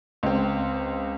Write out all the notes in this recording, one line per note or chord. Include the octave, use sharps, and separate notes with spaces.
C#2 C4